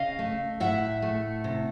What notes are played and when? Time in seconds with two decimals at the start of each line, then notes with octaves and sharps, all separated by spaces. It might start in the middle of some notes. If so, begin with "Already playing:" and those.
Already playing: C#3 D#5 F5
0.19 A3
0.60 A2 E5 F#5
1.02 A3
1.44 C3